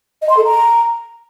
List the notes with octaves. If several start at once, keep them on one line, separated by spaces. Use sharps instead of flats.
D#5
C6
A4
A#5